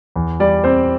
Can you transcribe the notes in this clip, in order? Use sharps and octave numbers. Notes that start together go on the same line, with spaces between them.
E2
G3 D5
C4 C5